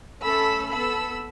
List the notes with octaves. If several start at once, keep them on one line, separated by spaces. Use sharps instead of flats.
A3 C#4 A4 B5 E6
B3 A4 B5 E6